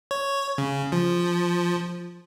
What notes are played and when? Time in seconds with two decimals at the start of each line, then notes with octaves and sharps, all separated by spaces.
0.11 C#5
0.58 C#3
0.92 F3